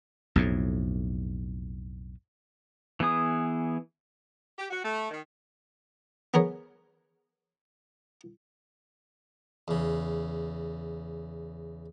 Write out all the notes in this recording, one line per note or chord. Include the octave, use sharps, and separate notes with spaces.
B1 F2 A2
E3 B3 G#4 D#6
G4
F#4
A3
D#3
B3 G#4 A#4 C#5
E2 C#3